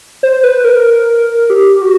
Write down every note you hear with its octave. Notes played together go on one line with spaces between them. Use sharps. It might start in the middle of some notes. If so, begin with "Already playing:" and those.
C5
B4
A#4
G4
F#4